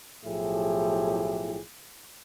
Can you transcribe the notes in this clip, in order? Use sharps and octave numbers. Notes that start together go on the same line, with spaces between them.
B1 A2 F3 E4 G4 G#4